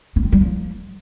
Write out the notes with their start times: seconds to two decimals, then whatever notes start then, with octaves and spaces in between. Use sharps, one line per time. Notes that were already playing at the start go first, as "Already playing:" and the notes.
0.16 C#4
0.24 C4
0.32 G3
0.41 F3